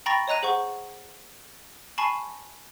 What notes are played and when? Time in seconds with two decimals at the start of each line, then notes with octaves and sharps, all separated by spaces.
0.06 G5 A#5 B5 C#6 A6 A#6
0.28 C#5 D#5 A#5 F#6 D#7
0.43 G#4 C5 F#5 C#6
1.98 G#5 A5 B5 C#6 C7 D#7